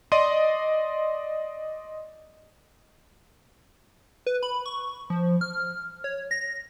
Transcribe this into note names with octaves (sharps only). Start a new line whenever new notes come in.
D5 D#5 C6 D#7
B4
B5
C#6
F3
F6
C#5
A#6